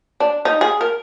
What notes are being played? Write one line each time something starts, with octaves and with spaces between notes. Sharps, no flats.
D4
D#4
G#4
A#4